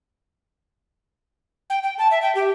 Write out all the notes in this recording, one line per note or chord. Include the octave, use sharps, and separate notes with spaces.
G5
G5
A5
E5
G5
G4